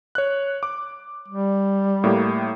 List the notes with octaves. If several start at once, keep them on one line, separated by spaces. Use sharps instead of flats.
C#5 F#6
D6
G3
A2 A#3 G4